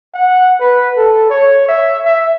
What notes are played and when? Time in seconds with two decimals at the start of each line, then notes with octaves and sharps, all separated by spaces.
0.14 F#5
0.60 B4
0.97 A4
1.30 C#5
1.68 E5
2.05 E5